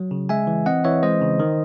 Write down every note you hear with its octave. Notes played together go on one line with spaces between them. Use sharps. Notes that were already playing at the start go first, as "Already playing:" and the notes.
Already playing: F#3
C#3
G#3 E5 G#5
E3
C4 D#5 F#5
E3 C#5 E5
G#3 C5 D#5
C#3
D#3